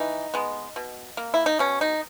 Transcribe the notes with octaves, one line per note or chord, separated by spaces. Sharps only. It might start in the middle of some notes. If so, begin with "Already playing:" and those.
Already playing: E3 D#4
G#3 B3
B2
A#3
E4
D#4
B2 C#4
D#4